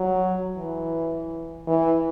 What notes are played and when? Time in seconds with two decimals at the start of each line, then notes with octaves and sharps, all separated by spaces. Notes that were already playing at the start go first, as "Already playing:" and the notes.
Already playing: F#3
0.57 E3
1.67 E3